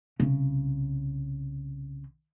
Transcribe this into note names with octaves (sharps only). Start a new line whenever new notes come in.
C2 C#3